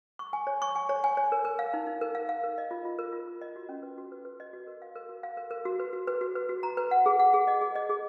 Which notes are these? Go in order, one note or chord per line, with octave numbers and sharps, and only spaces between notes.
C#6
G#5
C#5
C#6
G#5
C#5
G#5
C#5
A#4
A#4
F5
D#4
D#4
A#4
F5
F5
A#4
D#5
F4
F4
A#4
F4
F4
D#5
F#4
C#4
B4
F#4
B4
B4
D#5
F#4
A#4
F5
A#4
F#4
F5
A#4
A#4
F#4
B4
F#4
B4
F#4
B4
F#4
A#5
B4
F#5
G#4
F#5
G#4
D#5
G#4
D#5
G#4